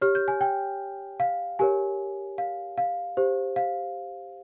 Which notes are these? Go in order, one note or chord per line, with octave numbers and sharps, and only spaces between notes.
G4 C#5 F6
G6
G#5
G5
F5
G4 A#4 C#5 G#5
F5
F5
G4 C5
F5